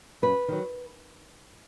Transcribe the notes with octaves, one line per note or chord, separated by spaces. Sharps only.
F#2 B4
D#3 F#3